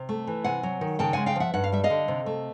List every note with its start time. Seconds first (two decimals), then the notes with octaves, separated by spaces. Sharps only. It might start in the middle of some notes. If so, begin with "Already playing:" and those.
Already playing: C3
0.09 A3
0.27 E3
0.44 C3 F#5 G#5
0.63 F#3
0.81 D#3
0.99 C#3 G5 A5
1.13 G#3 F#5 G#5
1.26 F5 G5
1.36 F3 E5 F#5
1.54 G2 F#5
1.64 F5
1.72 G3 E5
1.84 D#5 F5
1.90 D3
2.08 C3
2.26 A3